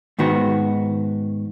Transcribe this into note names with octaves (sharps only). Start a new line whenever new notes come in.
G#2 D#3 B3 F#4